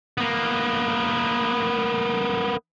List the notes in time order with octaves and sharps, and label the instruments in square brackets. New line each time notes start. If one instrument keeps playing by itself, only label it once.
[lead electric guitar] A#3 B3